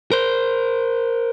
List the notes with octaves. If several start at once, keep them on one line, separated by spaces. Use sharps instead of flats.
A#4 C5